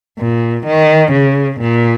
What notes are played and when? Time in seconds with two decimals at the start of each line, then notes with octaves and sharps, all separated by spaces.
0.19 A#2
0.67 D#3
1.13 C#3
1.61 A#2